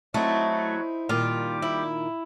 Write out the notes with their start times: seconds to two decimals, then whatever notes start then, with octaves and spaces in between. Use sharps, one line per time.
0.14 F#3 A3 C4 D#4 E4 F#4 C#5
1.09 A#2 D#3 G3 F4 G4 D6
1.62 E4